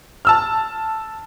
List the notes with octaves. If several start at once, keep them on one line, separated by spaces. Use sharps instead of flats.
A5 E6 F6